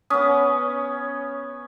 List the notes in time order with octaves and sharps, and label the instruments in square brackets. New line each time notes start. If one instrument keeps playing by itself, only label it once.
[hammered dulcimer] B3 C#4 [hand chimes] D#6